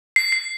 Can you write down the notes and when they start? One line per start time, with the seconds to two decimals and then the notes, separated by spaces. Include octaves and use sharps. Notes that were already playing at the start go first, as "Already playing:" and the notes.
0.16 C7
0.32 C7